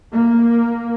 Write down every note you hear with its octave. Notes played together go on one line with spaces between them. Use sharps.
A#3